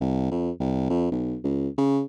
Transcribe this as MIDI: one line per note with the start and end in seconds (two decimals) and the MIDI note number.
0.01 0.30 36
0.31 0.51 41
0.60 0.86 36
0.90 1.10 41
1.12 1.37 35
1.44 1.68 37
1.78 2.02 49